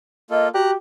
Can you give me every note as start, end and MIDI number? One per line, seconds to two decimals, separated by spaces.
0.30 0.49 58
0.30 0.49 65
0.30 0.49 69
0.30 0.47 75
0.54 0.72 66
0.54 0.74 67
0.54 0.71 82
0.54 0.71 90